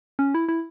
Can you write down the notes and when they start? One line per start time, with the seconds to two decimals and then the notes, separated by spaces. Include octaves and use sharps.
0.19 C#4
0.34 E4
0.49 E4